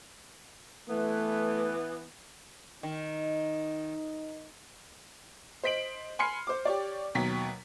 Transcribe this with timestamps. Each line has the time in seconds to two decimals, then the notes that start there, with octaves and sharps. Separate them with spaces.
0.89 E3 A3 B3
2.83 D#3 D#4
5.63 C5 D#5 B6 D7 F#7
6.19 G#5 B5 C6 F6 C7 C#7
6.47 C5 D6
6.65 G4 C#5 D5
7.15 D#2 B2 F#3 B6